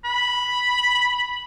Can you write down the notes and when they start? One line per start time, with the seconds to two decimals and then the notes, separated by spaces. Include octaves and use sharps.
0.04 B5